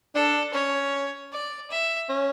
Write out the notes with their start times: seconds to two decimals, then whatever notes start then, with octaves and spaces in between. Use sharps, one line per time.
0.15 D4 A4
0.54 C#4 C#5
1.32 D5
1.71 E5
2.09 C#4